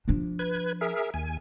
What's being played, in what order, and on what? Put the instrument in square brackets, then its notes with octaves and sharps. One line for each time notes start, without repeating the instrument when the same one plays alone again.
[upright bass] F3 D4
[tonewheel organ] B4 G#6
G#4 A#4 E5
D#2 G#5